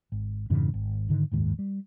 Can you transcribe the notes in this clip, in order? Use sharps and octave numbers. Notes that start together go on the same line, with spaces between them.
G#1
F2 G#2 C#3 E3
G#1
G#2 D3 D#3
F#1 D#2 G#2 D#3
G3